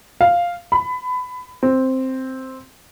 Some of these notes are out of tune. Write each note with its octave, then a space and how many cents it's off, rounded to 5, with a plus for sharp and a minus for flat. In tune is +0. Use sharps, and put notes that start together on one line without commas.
F5 +0
B5 +20
C4 +0